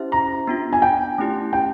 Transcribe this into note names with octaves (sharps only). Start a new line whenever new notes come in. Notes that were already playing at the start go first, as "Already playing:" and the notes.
Already playing: C#4 E4 G4 C5 E5
A#5
B3 D4 F4
G#5
G5
A3 C#4 E4 G4
G5